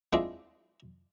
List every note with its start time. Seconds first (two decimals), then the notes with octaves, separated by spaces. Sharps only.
0.13 G#3 C4 D4 E4 F4 G#4